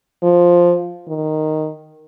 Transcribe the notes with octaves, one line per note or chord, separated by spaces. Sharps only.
F3
D#3